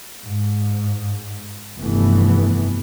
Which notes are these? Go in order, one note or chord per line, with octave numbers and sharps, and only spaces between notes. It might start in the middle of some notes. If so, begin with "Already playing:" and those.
G#2
F1 G2 E3 A3 B3